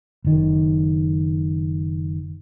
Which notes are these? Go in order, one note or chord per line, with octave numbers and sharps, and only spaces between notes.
F#1 D#3